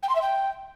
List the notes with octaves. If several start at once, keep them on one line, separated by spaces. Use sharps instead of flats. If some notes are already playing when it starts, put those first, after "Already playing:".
G5
C6
E5
G5